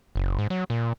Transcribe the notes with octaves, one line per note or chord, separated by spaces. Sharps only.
F#1
G#2
F#3
A#2